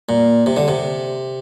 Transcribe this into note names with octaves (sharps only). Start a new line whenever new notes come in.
A#2
C3
D3
C3